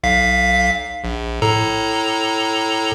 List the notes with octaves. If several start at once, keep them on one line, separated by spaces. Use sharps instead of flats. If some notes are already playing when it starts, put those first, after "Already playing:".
B1 F5 B6
A#1
A2 A4 A#5